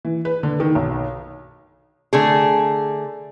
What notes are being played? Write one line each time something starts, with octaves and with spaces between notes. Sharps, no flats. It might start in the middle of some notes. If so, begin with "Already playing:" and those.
E3
B4
D3
D#3
B1
D3 A3 G#4